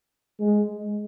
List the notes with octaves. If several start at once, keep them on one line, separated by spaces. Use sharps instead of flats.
G#3